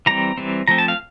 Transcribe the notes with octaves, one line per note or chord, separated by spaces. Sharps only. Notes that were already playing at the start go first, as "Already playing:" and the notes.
E3 G3 C4 A#5
E3 G3 C4
F3 A3 C4 A#5
A5
F5